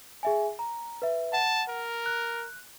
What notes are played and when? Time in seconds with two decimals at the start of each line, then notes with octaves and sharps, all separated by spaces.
0.23 G#4 E5 G#5
0.59 A#5
1.02 B4 E5
1.33 F#5 A5
1.68 A#4
2.06 F#6